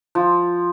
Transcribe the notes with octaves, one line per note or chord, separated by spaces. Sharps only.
F3